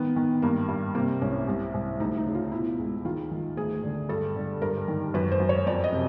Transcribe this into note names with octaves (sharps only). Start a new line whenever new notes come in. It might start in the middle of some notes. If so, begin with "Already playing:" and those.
Already playing: D#3 B3
D#3
G2 A#3
G2
C3 A#3
C2 C#4
C2
C2
D2 D#4
D#4
C#3
F4
B2 E4
C#2
D#3 F4
D#3
D2 G#4
D3
G2 A4
D3
G2 A#4
D#3
F#2 B4
C5
F#2
C#5
F2 D5
D#5
C3